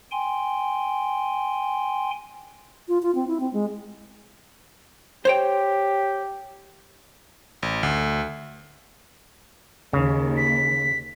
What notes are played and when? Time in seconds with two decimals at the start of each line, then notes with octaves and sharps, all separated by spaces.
0.11 G5 G#5 C6
2.88 F4
3.02 F4
3.15 C4
3.27 E4
3.40 C4
3.53 G#3
5.25 G4 C5 C#5 G5
7.63 A1
7.83 D2
9.93 D#2 C#3
10.37 B6